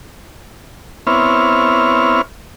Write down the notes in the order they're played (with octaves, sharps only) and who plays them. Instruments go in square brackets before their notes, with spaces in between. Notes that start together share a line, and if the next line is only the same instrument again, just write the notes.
[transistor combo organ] B3 C4 E4 C#5 F6